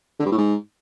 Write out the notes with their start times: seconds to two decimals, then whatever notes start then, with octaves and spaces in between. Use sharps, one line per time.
0.20 D3
0.26 G2
0.32 A2
0.38 G#2